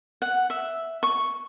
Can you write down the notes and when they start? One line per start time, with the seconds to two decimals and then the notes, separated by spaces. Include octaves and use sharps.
0.22 F#5
0.50 E5
1.03 C#6